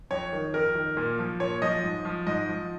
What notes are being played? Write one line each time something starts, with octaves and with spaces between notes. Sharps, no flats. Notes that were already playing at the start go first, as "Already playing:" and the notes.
F2 C#5
D#3
F2 A#4
D#3
A#2
F3
A#2 C#5
F3 D#5
G#2
F3
G#2 D#5
F3